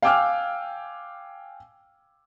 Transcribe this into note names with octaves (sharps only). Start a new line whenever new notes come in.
F5 G5 G#5 D6 E6 F6